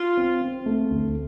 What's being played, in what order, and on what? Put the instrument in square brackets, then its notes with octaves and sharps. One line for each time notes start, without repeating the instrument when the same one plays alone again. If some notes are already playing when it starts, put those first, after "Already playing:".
Already playing: [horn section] F4
[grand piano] C4
C4
A3
D2